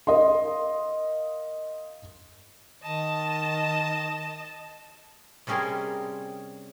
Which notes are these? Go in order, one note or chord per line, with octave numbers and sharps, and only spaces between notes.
A#4 D#5 F5 C6
D#3 D#5 A5
C3 G3 C#4 G#4 A#4 C6